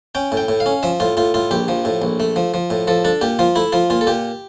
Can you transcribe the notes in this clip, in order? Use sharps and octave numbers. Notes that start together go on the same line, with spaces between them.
C#4 G5
A2
G5
A2
F5
C#4
F3 E5
A2 F4
A2 F4
A2 F4
A#1 G4
F3
A2
A#1
A3
F3
F3
A2
F3 A4
D4 A4
A#2 G4
F3 F4
A3 E4
F3 F4
A#2 F4
A4
A#2 G4